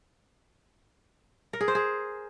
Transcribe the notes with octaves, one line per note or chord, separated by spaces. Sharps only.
A#4
G#4
C5
G#4